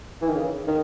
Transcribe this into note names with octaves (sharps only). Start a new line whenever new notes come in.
E3
D#3
C#3
D#3